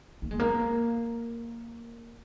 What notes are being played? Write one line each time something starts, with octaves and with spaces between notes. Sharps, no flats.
A#3
G#3
A#3